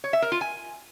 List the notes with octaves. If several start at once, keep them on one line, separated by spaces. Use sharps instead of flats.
C#5
E5
A#4
F4
G#5